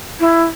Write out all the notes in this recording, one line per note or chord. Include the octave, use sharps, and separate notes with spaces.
E4